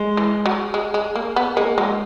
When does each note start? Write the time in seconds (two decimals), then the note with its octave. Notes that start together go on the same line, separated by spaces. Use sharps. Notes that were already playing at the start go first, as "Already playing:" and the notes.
Already playing: G#3
0.17 E3
0.46 F#3
0.74 G#3
0.94 G#3
1.15 A#3
1.36 B3
1.56 G#3 A#3
1.77 F#3 G#3